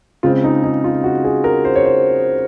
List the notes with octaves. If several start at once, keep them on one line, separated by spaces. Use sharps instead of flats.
C#3 G#3 C4 F4
D#4
D#4
F4
F#4
G#4
A#4
C5
C#5
C5